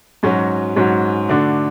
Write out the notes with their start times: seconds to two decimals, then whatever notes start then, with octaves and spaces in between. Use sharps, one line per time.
0.23 G#2 F#3 C#4 F#4
0.76 G#2 F#3 C#4 F#4
1.29 D3 A3 D4 F#4